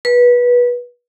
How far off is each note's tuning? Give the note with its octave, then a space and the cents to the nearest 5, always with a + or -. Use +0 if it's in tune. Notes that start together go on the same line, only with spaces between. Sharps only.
B4 -20